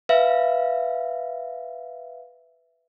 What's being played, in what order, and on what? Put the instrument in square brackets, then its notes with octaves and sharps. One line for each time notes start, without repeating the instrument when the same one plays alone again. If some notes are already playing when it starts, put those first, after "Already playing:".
[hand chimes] B4 E5 F5